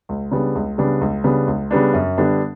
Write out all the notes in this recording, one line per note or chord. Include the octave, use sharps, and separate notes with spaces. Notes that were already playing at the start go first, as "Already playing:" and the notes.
C#2
C#3 G3 B3 D4
C#2
C#3 G3 B3 D4
C#2
C#3 G3 B3 D4
C#2
C#3 G3 B3 D4
F#2
D3 G3 B3 D4